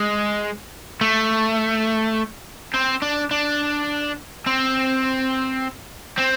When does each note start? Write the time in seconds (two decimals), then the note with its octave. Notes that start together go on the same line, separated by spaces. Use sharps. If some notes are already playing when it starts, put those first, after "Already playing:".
Already playing: G#3
1.01 A3
2.74 C4
3.02 D4
3.31 D4
4.46 C4
6.18 C4